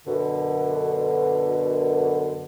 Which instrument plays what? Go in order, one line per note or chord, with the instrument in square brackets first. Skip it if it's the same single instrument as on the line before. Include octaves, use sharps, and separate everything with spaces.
[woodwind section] F#2 B2 D3